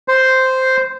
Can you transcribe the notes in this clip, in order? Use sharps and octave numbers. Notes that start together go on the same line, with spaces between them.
C5